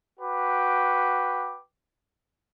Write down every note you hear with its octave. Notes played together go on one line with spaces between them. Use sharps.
F#4 B4 G5 D6